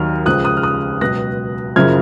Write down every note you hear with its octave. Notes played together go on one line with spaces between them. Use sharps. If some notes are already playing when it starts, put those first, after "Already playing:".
Already playing: D#2 D#3 F#3 F6
C#2 C#3 F3 D#6 F#6
D#6 F#6
F6
D#6 F#6
C#2 B2 F#3 F#6 A#6
F#1 F#2 C#3 F3 F6 G#6